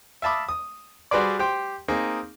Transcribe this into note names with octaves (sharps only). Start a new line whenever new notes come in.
E5 F5 A5 B5 D6 D#6
D#6
G3 F#4 G#4 B4 C5 D5
G4 C5 G5
A#3 C4 D#4 G#4